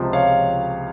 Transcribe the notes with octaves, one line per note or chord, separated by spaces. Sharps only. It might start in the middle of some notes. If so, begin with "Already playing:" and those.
Already playing: C#2 C3 F3
C#5 F5